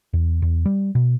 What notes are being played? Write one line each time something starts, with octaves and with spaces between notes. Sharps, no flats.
E2
E2
G3
B2